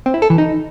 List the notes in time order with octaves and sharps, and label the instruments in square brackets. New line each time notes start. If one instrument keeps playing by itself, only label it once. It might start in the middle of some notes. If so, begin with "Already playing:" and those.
[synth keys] C4
E4
A4
E3
D#4